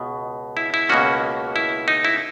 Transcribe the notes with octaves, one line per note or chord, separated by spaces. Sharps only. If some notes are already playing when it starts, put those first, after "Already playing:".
Already playing: C#2 B2
E4
E4
C#2 B2 A#3 C#4 F#4
E4
D#4
E4